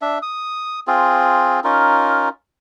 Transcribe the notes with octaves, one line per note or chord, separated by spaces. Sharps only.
D4 E5
D#6
C4 F4 G#4
C#4 D#4 F4 A#4